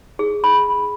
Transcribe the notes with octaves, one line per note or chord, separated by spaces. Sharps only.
G#4
B5